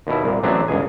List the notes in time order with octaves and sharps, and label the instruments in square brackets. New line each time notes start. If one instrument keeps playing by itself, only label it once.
[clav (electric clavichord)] D#2 B2 E4
C2 A#2
A1 F#3 C4 D4 G#4 E5
G1 C#2 G#4 G#5